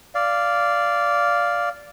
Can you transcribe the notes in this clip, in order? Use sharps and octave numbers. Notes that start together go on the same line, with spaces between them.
D5 F5